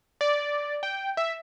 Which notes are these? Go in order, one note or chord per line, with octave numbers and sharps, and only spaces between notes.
D5
G5
E5